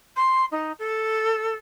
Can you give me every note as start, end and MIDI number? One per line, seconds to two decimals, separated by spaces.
0.16 0.45 84
0.51 0.72 63
0.79 1.56 69